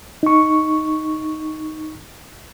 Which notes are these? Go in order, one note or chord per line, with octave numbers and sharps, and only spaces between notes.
D#4 C#6